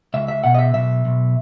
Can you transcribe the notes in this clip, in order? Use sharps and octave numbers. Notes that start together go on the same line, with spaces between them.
C#2 E5
E5
B2 F#5
D#5
E5
B1 E5
B1